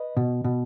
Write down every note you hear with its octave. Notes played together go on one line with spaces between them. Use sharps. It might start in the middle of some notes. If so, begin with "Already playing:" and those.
Already playing: B4 D#5
B2
B2